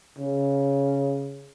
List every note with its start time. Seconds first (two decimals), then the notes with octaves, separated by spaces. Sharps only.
0.18 C#3